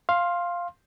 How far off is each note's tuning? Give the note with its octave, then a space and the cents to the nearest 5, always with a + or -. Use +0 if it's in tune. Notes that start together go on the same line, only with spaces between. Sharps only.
F5 +0 C6 +15